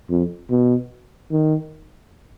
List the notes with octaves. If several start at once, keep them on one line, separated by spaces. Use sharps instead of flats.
F2
B2
D#3